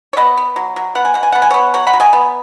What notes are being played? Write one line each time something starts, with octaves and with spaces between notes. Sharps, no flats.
C#5
B3 B4 D#5
B3
F#3
F#3
B3 F#5
G#5
B2 F#5
G#5
B3 F#5
G#5
B3 C#5 F#5
F#3 C#5 F#5
F#5 B5
F#3
D#5 G#5
B3